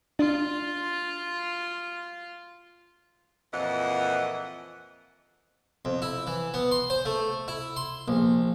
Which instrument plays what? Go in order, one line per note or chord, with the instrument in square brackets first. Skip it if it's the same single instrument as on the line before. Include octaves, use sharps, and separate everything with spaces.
[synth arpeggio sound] D4 [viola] F4
[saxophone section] F2 A#2 E3 F3 D#5 F#5
[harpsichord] F2
E4
E3
B3
C6
C5
A3
E4
C6
A#1